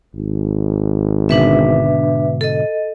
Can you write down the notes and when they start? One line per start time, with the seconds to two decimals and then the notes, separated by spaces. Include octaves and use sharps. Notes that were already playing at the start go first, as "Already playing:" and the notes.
0.15 G#1
1.29 G#2 B2 D3 D4 B4 E5
2.41 A4 D#5